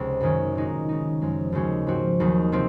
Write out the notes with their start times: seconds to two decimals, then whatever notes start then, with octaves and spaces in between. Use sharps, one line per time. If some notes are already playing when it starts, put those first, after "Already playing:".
Already playing: C#2 C3
0.21 F#2 D#3 G#3 C#4
0.55 A#2 G#3 D#4 F#4
0.89 C#3 G#3 D#4
1.21 F#2 F3 G#3
1.52 D#2 C#3 G#3 C#4 F#4
1.87 G#2 F3 C4 F#4
2.20 D#2 C#3 F#3 A#3
2.52 C3 F3 C4